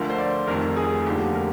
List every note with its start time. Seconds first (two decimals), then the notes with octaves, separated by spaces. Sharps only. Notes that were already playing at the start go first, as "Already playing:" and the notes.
Already playing: D2 D3 F3 A#4
0.10 C5
0.18 D5
0.47 F1 F2 D#3 A#4
0.76 G#4
1.06 F1 D#2 D3 F3 G4
1.35 A#4